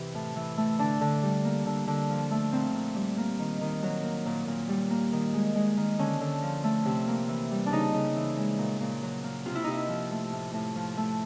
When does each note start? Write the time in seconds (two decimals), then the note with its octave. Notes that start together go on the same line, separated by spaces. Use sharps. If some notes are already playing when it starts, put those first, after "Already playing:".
Already playing: C3 E3
0.15 A2
0.36 E3
0.57 A3
0.79 D3 D4
1.01 D3
1.23 G3
1.45 A#3
1.66 D3
1.87 D3
2.10 F3
2.31 A3
2.53 A#2 C4
2.75 A#2
2.95 G3
3.18 A#3
3.39 D#3
3.61 D#3
3.83 F#3
4.04 A#3
4.26 A#2
4.48 A#2
4.69 G3
4.90 A#3
5.12 D#3
5.33 G#3
5.55 G#3
5.77 D#3
5.99 D3 C#4
6.21 D3
6.42 F3
6.64 A3
6.85 C3
7.07 A#3
7.28 E3
7.51 G3
7.66 D4
7.72 C#3 D#4
7.94 C#3
8.16 E3
8.38 G#3
8.58 A#2
8.80 A#2
9.03 F#3
9.24 A#3
9.46 C3 F4
9.55 E4
9.64 C3 D#4
9.73 E4
9.89 F3
10.10 A3
10.32 A2
10.54 A2
10.76 F3
10.97 A3